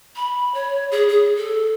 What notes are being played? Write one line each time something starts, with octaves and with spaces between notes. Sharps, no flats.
B5
C#5
G#4
G#4
A4